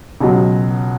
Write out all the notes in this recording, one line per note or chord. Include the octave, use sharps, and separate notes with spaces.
C#2 B2 F#3